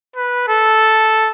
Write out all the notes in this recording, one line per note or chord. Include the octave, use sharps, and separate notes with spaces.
B4
A4